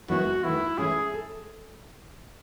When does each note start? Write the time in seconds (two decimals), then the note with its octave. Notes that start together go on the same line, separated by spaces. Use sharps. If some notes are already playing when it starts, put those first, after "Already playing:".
0.09 F#2 E3 G#3 B3 E4 F#4
0.44 E2 D#3 A3 E4
0.78 E3 A3 C#4 E4 G#4
1.14 A4